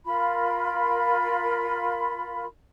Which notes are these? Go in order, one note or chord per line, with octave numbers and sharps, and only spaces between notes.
F4 A#4 B5